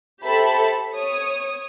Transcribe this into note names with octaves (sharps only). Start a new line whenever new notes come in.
G4 A4 C5 E5 A5 B5
C#5 D#6